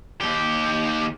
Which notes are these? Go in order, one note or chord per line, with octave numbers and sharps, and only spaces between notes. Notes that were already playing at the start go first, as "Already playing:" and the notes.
D#2 G4